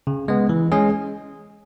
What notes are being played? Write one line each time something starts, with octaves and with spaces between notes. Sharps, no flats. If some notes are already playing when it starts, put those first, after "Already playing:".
C#3
G#3 B3
E3
G#3 C#4 G#4